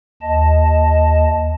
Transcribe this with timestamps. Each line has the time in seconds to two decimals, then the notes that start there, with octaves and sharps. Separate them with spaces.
0.22 D#2 D#5 A5